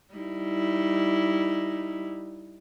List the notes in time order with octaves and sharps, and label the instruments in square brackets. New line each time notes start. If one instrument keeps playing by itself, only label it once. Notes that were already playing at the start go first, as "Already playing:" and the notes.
[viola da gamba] G3 D#4 E4